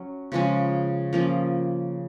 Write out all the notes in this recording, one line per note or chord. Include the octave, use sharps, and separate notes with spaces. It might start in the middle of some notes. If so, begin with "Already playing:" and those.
Already playing: F#3 C#4
C#3 F3 G#3 C#4
F3 A#3 C#4 G#4